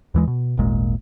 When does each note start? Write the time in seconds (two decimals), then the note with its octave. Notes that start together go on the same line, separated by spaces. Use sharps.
0.14 D#2 E3 G#3
0.27 B2
0.57 D#1 G#1 A#2 G#3